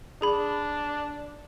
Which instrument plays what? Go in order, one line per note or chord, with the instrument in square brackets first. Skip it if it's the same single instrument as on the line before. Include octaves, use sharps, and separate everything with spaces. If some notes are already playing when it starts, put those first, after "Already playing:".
[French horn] D4 [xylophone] G#4 B5